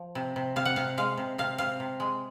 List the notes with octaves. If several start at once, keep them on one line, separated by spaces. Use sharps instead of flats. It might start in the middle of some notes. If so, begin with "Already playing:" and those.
Already playing: F3
C3
C3
C3 F5
F#5
C3 F5
G#3 F5
C3
C3 F5
C3 F5
C3
G#3